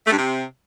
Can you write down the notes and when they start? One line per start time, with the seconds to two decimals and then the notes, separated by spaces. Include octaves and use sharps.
0.06 A3
0.12 G2
0.17 C3